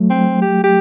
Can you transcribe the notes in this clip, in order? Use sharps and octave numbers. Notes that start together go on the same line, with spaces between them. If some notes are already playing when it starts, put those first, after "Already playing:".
Already playing: F#3 A3
C4
G4
G4